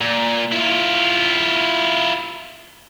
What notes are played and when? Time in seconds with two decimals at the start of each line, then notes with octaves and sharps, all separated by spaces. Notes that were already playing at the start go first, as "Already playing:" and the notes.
0.01 A#2
0.52 E4 F4